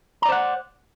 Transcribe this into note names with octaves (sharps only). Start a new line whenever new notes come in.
C5 D5 F#5 A#5